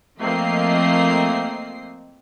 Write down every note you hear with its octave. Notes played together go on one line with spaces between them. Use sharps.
F3 A3 A#3 C4 D#5 C7